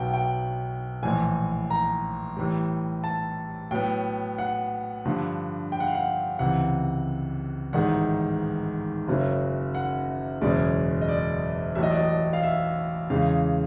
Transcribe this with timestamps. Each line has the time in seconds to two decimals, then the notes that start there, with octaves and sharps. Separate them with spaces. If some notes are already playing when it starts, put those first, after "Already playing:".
Already playing: B1 B2 F#3 B3 F#5 G5
0.14 G5
1.03 A#1 A2 E3 G#5
1.70 A#5
2.37 A2 E3 G3
3.04 A5
3.71 A2 F#3 B3 G5
4.38 F#5
5.05 G2 D3 F3
5.72 G5
5.80 F#5
5.87 F5
5.95 F#5
6.39 C#2 C3 E3 F#5
7.73 A1 G#2 D#3 G#3 F#5
9.08 F#1 F#2 C#3 F#3
9.75 F#5
10.41 F#1 E2 B2 G#3 C#4 D5
11.01 D#5
11.09 D5
11.75 A1 A2 F#3 A3 E5
11.83 D#5
11.91 D5
11.97 D#5
12.33 F5
12.43 E5
13.10 E2 C#3 E3 G#3 F5